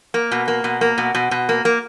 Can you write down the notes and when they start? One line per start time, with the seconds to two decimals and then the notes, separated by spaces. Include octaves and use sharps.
0.14 A#3
0.31 B2
0.48 A#3
0.64 B2
0.81 A#3
0.98 B2
1.15 B2
1.31 B2
1.49 A#3
1.65 A#3